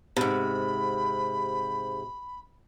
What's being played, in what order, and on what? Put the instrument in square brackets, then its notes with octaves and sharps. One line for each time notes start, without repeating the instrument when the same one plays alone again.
[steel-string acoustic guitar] G#2 C3 [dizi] B5